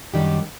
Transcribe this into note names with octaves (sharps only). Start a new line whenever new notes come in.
F#2 D#3 G3 D4 G4